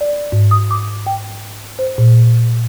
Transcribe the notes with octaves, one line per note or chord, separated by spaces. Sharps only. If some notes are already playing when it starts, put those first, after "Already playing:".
D5
G#2
D#6
D6
G5
C5
A#2